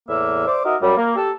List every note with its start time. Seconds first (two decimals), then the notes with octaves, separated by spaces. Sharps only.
0.08 E2 A2 A#3 E5
0.48 C5 D5 D6
0.65 D#4 F#4 A#4 D#5 E5
0.81 F#2 F#3 G3
0.97 A#3
1.16 G4 A4